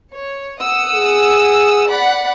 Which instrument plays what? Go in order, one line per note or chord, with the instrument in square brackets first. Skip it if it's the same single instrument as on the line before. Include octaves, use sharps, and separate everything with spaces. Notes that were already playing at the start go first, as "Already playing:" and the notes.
[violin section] C#5
F#5 D#6 E6
[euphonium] G#4
[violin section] D5 F#5 B5